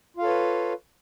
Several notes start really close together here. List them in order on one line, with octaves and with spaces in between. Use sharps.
F4 F5 A4 C#5 B4